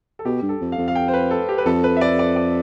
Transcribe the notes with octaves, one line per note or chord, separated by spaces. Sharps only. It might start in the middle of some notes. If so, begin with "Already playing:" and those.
A4
B2 G4
G2
A4
F2
F5
F2
F5
G5
C5
B4
A4
G4
B4
F2 A4
B4
E5
D5
D5
D5